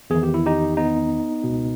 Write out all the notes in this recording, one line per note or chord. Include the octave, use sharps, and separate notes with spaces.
E2 D#3 G#4
G4
E4
D#4 G4
B3 D#4
B2
C#2